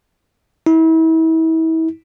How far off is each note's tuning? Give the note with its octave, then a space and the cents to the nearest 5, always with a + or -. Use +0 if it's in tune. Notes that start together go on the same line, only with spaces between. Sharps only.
E4 -35